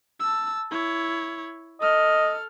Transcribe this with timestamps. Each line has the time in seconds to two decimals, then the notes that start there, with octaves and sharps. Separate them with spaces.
0.20 A5 E6
0.71 E4 C#5
1.81 A4 D#5 F6